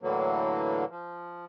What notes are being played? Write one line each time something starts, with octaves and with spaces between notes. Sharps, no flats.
A2 D3 E3 F#3 A#3
F3